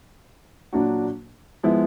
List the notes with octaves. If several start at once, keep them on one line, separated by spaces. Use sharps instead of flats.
A#2 F#3 A#3 D4 F#4
F3 G#3 B3 E4